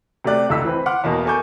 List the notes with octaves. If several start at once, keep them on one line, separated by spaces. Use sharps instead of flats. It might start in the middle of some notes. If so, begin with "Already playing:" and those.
C3 A3 G4 D5 F#6
F1 C#2 D#4 A4 E6 B6
E3 C4 B4
F#5 C6 D6 F6
E2 B2 A#3
A4 A#4 G#5 C#6 D6 G6